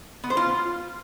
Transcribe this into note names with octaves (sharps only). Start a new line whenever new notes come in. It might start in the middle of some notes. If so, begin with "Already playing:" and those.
B3
C5
F4